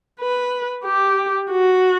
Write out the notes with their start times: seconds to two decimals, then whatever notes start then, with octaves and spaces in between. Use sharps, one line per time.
0.20 B4
0.85 G4
1.51 F#4